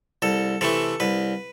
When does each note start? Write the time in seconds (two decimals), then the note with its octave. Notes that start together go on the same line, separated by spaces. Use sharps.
0.22 C2 A4
0.61 C3 E3 A3 A4
1.00 C2 B4